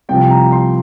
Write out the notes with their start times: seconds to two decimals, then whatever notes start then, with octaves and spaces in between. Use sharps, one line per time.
0.09 C2 C3 F3 G5
0.30 A#5
0.52 C6